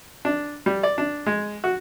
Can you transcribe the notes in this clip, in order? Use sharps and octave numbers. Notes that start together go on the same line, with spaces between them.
D4
G3
D5
D4
G#3
F#4